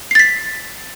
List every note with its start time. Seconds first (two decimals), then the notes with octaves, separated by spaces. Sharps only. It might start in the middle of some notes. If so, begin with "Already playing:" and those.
0.11 C7
0.15 A6
0.19 B6